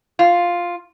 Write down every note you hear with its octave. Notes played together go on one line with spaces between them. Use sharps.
F4